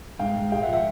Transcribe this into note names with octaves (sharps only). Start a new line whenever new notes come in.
G#2 F5 G5
G#2
G#3 F5 G5
E5 F#5
F3
E5 F#5